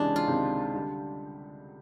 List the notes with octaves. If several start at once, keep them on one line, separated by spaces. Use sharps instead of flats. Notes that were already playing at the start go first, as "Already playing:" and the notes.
Already playing: C#2 C3 E3 G#3 C#4 D4
F4
C#2 C3 D#3 G#3 C4
D3 G3